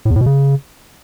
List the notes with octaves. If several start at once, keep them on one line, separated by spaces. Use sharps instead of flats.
A2
E2
A2
B2
C#3